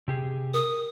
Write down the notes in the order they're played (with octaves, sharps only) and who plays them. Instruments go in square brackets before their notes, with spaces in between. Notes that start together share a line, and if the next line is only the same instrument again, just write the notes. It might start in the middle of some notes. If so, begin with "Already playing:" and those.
[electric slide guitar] C3 G4 G#4
[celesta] A#4 [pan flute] D#6